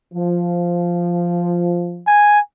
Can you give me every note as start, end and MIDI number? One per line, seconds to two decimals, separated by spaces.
0.14 2.04 53
2.07 2.40 80